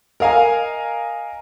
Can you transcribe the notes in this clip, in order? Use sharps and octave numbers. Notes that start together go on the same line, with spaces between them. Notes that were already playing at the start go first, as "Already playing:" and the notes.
A#4 D#5 F5 G#5 A#5